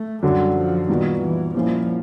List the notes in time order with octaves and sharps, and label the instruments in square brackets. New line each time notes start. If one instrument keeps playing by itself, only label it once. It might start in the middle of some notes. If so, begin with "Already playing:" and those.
Already playing: [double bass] A3
[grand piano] F#2 D3 F#3 [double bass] G3
[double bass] F3
[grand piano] A#2 G3 B3 D#4 F#4 [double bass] D#3
[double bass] E3
[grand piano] A#2 G3 A#3 C#4 E4 [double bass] F3